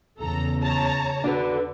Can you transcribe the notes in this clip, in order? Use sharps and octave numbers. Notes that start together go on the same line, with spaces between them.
E2 C#3 A4 A#5
C#5 A5 A#5
D3 D4 F#4 B4